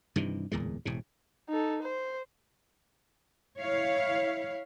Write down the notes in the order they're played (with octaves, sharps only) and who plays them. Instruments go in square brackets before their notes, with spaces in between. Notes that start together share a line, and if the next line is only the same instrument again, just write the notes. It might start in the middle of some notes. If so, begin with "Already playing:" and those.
[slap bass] G2 C3 D#3 E3
D1 E2 A#2 G#3
E1 A2 C3
[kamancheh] D#4 A4
C5
[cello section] E4 C#5 F5